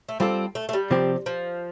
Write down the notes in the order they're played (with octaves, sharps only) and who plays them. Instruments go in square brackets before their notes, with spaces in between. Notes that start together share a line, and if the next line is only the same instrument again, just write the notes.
[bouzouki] A3
[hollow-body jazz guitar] G3 F4 A4 [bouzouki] C4
[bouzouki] A3
A3
G3
[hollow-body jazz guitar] C3 F3 C4 G4
[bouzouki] F3